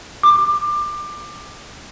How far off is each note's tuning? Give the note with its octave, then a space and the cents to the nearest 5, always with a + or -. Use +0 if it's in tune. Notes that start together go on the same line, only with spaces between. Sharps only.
D6 +25